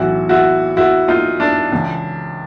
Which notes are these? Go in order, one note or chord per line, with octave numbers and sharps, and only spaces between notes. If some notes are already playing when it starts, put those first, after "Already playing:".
Already playing: B1 A2 E3 E4 F#4
E4 F#4
E4 F#4
D#4 F4
D4 E4
C#2 C#3 E3